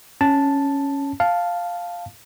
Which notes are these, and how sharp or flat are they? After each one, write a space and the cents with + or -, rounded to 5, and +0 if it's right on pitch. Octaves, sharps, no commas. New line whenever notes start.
C#4 +0 A5 +0
F5 +0 A5 +0